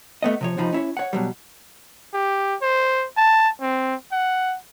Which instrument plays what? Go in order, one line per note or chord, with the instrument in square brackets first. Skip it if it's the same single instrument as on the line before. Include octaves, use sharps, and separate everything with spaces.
[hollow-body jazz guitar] A3 B3 D#5
C3 F3 C#5
F2 C3 F3 D#4 B5
C#4 E4 C#5
C#5 F#5
B2 F#3 G3
[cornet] G4
C5
A5
C4
F#5